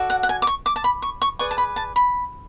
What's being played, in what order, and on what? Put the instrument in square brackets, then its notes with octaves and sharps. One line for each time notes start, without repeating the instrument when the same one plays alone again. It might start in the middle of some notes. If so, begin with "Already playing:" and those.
Already playing: [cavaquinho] F#4 A4 D5
F#5
F#5
G#5
D6
C#6
D6
A5
B5
C#6
C#6
G#4 B4 D5 C#6
A5
B5
A5
B5